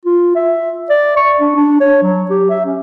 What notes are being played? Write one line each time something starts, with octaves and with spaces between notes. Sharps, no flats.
F4
E5
D5
C#6
D4
D4
C#5
F#3
G4
E5
C#4